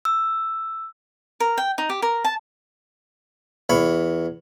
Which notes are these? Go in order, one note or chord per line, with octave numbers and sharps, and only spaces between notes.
E6
A#4
G5
D#4
G4
A#4
A5
E2 C#5 B5